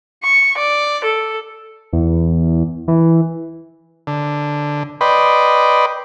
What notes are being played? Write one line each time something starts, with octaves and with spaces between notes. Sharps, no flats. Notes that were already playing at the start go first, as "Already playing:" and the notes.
C#6
D5
A4
E2
E3
D3
B4 D5 D#5 G5 B5 C6